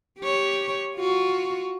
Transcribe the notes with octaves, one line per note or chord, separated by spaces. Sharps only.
G4 C#5
F4 F#4